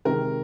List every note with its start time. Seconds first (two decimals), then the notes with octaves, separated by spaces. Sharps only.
0.05 C3 D#3 G#3 A#4